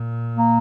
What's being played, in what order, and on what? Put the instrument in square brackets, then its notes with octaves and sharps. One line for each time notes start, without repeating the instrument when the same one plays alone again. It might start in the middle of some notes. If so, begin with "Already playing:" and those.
Already playing: [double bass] A#2
[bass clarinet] A#3